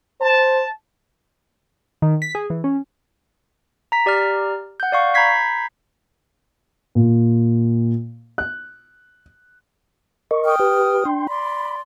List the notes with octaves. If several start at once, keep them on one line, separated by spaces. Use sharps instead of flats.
C5 A5
D#3
B6
G#4
E3
C#4
A#5 B6
G4 D5 A#5 F6
F#5 G6
D5 F5 C#6
A#5 B5 G6 G#6 B6 C7
A#2
F#6
A#4 D#5 C#6
G5 D#6 F6
G4 B4
D4 G5 C6
D5 B5 C6